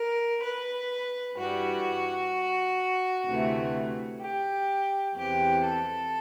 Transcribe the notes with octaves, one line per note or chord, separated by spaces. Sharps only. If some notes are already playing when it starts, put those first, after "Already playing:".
Already playing: A#4
B4
G2 E3 G3 F#4
D2 C3 E3 A3
G4
E2 C3 E3 G4
A4